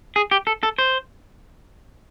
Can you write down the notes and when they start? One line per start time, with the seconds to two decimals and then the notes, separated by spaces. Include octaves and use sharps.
0.16 G#4
0.31 G4
0.47 A4
0.63 A4
0.78 C5